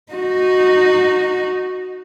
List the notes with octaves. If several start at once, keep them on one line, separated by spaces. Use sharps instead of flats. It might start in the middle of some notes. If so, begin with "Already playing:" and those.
D#4 F#4